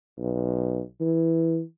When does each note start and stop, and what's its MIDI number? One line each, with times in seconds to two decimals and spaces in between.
0.18 0.80 35
1.01 1.60 52